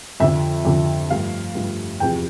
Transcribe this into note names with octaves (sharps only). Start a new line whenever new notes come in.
F2 D3 F3 E5
F2 D3 F3
G2 F3 A3 F5
G2 F3 A3
E2 C3 F3 G5